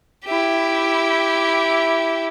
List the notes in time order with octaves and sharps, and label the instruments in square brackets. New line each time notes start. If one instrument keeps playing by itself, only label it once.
[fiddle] E4 G4